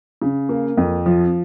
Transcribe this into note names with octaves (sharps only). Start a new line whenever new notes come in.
C#3
A#3
F2
F3